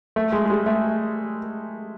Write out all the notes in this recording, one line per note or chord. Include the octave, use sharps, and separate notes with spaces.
A3
G#3
G#3
G3
A3